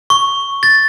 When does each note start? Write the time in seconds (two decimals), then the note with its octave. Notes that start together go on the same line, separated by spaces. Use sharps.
0.10 C#6
0.63 A6